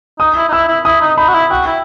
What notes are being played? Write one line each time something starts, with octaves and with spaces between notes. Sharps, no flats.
D#4 D#6
E4
D#4
E4 E6
E4
E4 D#6
D#4
D#4 B5
F#4
E4
F#4 G5
E4